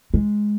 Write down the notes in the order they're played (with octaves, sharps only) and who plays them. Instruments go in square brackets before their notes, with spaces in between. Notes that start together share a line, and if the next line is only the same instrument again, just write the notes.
[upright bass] G#3